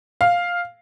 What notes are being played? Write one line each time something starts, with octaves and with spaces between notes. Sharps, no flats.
F5